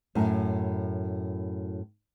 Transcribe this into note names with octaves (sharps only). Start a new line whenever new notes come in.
F#2 A2